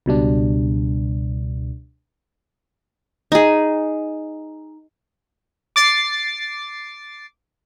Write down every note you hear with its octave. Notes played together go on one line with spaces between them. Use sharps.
C#2 B2 G3 D4
D#4 G#4
D6 A6 C7